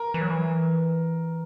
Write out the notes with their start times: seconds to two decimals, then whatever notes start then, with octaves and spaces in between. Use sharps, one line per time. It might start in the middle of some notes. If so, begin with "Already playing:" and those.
Already playing: A#4
0.14 E3
0.21 F#3
0.30 E3